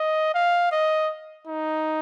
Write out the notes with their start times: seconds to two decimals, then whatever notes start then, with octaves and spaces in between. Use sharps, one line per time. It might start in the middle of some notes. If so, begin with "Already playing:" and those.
Already playing: D#5
0.34 F5
0.72 D#5
1.47 D#4